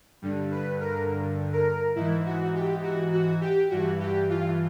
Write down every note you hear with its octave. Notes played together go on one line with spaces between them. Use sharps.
G2 D3
B4
A#4
A#4
G#2 E3 E4
F#4
G4
F#4
F#4
G4
G2 E3 F#4
G4
F4